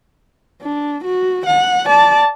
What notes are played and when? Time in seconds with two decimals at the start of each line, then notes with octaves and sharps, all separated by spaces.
0.62 D4
1.04 F#4
1.46 F#5
1.86 D5 A5